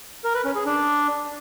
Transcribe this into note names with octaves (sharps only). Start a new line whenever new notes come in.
A#4
B4
C#4
G#4
D4